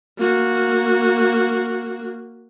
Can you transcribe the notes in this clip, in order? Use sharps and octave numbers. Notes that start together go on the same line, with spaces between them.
A#3 F#4